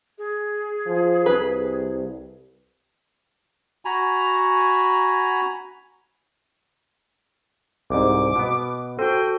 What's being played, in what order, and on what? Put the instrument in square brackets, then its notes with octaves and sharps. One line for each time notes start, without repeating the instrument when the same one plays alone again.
[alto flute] G#4
[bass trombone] F3
[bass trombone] C2 [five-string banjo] B4
[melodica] F#4 G#5 A#5 B5
[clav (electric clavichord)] C2 G#2 [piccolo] D6
[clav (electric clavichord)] B2 B3
[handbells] F#4 A4 [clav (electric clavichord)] C5 [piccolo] G5